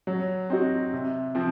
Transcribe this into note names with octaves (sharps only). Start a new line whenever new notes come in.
F#3
C4 D#4 F#4
C3
F3 C4